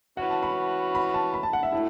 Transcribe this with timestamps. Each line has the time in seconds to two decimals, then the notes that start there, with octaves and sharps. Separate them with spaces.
0.17 E3 C#4 F#4 F#5
0.30 A5
0.43 B5
0.95 B5
1.14 A5
1.34 B5
1.43 A5
1.53 F#5
1.63 E5
1.72 A2 F#3 A3 E4